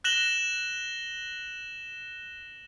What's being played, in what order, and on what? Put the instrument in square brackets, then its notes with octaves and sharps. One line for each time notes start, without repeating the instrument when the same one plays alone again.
[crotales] F#6 A#6 E7 F#7 G7